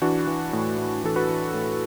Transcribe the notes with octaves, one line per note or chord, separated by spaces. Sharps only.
E3 D4 F#4
E3
A2
A2
E3 A4
F#4 B4
E3
A2